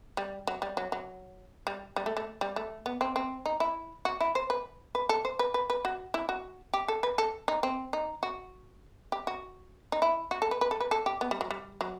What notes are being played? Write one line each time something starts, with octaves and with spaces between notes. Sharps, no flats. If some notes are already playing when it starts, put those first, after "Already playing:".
G3
F#3
G3
F#3
F#3
G3
G3
A3
A3
G3
A3
B3
C4
C4
D#4
E4
F#4
E4
C5
B4
B4
A4
C5
B4
B4
B4
F#4
E4
F#4
G4
A4
B4
A4
D#4
C4
D#4
F#4
G4
F#4
D#4
E4
F#4
A4
B4
B4
A4
B4
A4
G4
B3
G3
F#3
G3
F#3